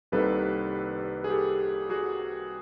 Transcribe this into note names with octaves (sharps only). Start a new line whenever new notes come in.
C2 C3 D#3 G3 A#3 A4 B4
G#4
G4 A4
F#4 G#4